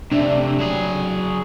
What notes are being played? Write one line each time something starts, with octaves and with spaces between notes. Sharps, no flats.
C3 A3 D4
F#3 G#4